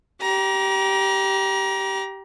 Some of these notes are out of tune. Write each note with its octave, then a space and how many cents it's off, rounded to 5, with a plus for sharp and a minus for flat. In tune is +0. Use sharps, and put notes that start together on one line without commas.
G4 -15 A#5 +30